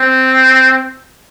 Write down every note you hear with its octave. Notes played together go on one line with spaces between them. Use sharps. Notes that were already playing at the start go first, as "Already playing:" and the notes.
Already playing: C4